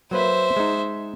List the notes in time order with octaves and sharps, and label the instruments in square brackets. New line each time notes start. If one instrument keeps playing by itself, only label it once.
[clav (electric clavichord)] F#3 A#3 B4 [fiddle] C5 E5
[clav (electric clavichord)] G#3 D#4